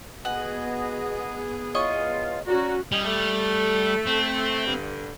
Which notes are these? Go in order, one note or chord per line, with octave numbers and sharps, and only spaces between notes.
B3 F#4 G#4 B4 D#5 F#5 G#5
E2 F4 C#5 D#5 C#6
C#4 F#4 D5 A#5
G3 C#4 D#4 D#5
A3
C4
G2 D3